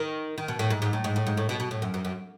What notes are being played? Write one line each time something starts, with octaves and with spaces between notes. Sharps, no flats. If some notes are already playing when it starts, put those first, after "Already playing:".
Already playing: D#3
D#3
B2
A2
G#2
G#2
A2
G#2
A2
G#2
A2
B2
B2
A2
F#2
F#2
F#2